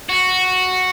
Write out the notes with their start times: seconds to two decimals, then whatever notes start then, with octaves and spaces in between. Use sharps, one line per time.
0.09 F#4